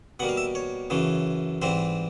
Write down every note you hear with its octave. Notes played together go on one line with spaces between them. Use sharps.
B2 G3 A#3 F#5
F5
E5
C#5
F#2 C#3 E3 A3
G#2 E3 G3 C4 C5